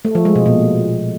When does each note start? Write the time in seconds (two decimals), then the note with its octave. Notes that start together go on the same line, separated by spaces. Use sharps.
0.05 A3
0.15 F3
0.25 G#3
0.35 B2
0.46 A#2